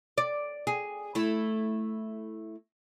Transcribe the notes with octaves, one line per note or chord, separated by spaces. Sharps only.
D5
G#4
A3 E4